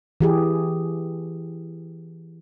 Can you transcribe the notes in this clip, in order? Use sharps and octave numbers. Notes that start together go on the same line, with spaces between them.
E3 G4 G#4